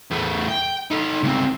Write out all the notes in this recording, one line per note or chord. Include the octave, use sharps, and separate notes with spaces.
E2 A3
G5
D#4 A4
C#2 C4